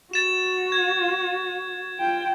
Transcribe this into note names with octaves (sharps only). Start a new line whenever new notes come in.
F#4 A6 E7
G#6
F4 G5